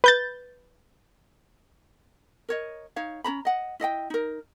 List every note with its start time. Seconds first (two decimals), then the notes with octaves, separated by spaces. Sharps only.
0.04 B4 G6 A6
2.49 A#4 C#5 D#5
2.96 D#4 C#5 F5
3.24 C#4 C5 A#5 B5
3.45 D#5 F#5
3.80 E4 D#5 F#5 G5
4.10 D#4 A#4